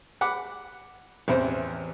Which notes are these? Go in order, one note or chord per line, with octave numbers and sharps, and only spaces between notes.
F#5 B5 D6
A1 E2 C4 C5